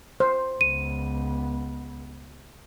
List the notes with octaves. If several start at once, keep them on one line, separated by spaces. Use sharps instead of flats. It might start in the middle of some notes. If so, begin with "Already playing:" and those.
C5
C#2 B3 D#7